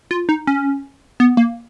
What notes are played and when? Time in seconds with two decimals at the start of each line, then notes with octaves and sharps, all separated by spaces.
0.11 F4
0.29 D#4
0.47 C#4
1.20 B3
1.37 A#3